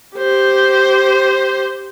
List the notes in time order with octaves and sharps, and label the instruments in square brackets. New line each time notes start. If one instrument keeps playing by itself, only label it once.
[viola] G4 C5